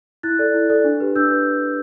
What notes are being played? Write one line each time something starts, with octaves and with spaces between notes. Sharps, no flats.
E4 F#6 A6
A4 D5
E4
A4 D5
D4
G4 B4
D4 E6 G6
B4